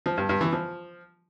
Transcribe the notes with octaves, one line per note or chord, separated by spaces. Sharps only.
F3
G2
G2
E3
F3